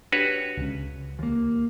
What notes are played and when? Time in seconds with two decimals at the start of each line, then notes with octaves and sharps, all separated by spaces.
0.12 D4 F#4 G4 B4 C#5
0.57 C#2 C#3
1.19 D#2 A#3